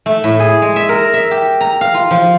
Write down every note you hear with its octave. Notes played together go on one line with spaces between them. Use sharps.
A3
A2
G#4
G#3
E5
A#4
E5
G4
A#5
F5
F4
F3